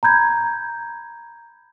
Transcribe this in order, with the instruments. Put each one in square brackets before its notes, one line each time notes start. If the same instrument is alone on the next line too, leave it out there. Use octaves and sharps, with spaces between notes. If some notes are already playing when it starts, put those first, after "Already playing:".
[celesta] A#5 B5 G6 G#6